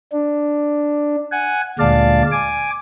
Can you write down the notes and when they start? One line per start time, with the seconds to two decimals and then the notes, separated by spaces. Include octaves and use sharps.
0.12 D4
1.32 F#5 G#5
1.79 D2 A#2 G#3 D5 F5 A5
2.32 G#5 D6